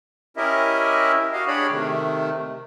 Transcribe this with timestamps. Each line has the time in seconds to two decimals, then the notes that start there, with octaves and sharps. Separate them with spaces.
0.37 C#4 E4 G4 A#4 D#5 E5
1.33 F#4 D#5 F5
1.47 D4 G4 G#4 C#5 D5 B5
1.70 C3 D#3 A3